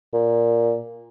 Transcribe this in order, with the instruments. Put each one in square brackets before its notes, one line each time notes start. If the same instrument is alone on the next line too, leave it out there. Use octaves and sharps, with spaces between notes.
[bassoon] A#2